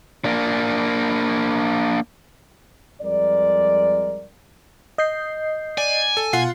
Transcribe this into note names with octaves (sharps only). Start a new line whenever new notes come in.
A#3 D4
F2 G3 G#3 A#4 D5
D#5 G6 C7
D5 G#5
A4
B2 F4 F#5 C7